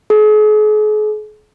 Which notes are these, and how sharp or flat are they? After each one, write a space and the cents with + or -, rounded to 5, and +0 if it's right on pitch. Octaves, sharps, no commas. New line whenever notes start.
G#4 +40